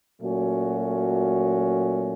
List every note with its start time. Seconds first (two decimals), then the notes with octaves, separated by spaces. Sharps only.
0.21 A#2 F#3 A3 C#4 F#4